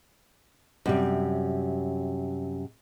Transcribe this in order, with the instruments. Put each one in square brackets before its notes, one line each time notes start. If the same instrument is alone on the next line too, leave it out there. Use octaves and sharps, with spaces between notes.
[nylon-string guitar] F#2 C3 G3